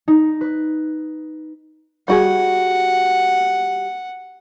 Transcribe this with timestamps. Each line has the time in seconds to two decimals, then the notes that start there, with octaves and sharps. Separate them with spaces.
0.08 D#4
0.41 B4
2.08 G3 F#4 G#4 F#5